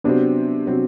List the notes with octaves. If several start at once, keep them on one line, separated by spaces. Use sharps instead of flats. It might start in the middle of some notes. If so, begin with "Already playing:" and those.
C3 F#3 B3 C4 D4
C3 F#3 C4